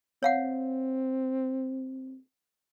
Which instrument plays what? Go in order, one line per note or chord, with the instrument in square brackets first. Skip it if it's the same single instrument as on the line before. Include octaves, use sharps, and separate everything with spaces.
[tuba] C4 [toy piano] C#5 F5 F#5